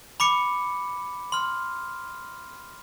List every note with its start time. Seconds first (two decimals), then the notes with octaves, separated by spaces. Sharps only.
0.20 B5 D6 C#7
1.32 C6 F6